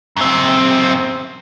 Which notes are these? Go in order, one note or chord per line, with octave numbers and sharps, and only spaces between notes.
F#2 C4